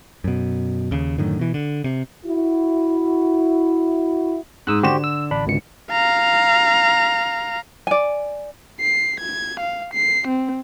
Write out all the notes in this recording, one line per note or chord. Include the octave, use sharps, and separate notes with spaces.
F#2 B2
D#2 C#3
F#2 A2 D3 D#3
B2 E3
D3
C3
E4 F#4
G#2 D#6 E6 F#6
D3 F#4 G4 C5 E7
E6
A1 D4 B5
G#1 C#2 C#7
F5 A#5
D5 G#5
C7
G#6
F5
C7
C4